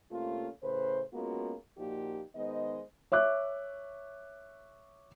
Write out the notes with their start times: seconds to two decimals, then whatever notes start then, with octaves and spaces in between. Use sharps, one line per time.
0.11 C3 A3 A#3 C#4 F4
0.63 A2 C#3 B4 C5
1.13 G#3 A#3 B3 C#4 F4 F#4
1.78 A#2 F3 A#3 D#4 F#4 G4
2.35 D#3 G#3 B3 C5 D#5
3.12 C#5 E5 D6 F#6